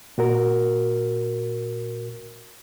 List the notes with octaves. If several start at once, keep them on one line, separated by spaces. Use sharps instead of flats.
A#2 F#4 A#4